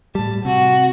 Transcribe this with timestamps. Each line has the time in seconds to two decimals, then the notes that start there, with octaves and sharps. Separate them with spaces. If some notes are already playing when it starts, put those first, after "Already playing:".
0.15 A2 G3 A5
0.45 C3 F#4